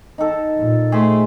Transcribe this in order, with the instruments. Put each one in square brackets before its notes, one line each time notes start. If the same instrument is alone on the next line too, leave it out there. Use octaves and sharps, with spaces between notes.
[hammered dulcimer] D#4 A4
[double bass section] A#2
[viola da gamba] A3 [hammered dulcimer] G#4 C5